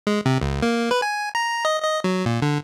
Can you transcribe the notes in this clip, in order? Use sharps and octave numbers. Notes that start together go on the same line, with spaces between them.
G#3
C3
C#2
A#3
B4
G#5
A#5
D#5
D#5
F#3
A#2
D3